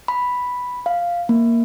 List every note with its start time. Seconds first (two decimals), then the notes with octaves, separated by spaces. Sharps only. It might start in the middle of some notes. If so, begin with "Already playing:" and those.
0.08 B5
0.86 F5
1.29 A#3